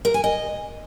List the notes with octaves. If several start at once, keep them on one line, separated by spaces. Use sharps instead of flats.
A#4
G#5
D#5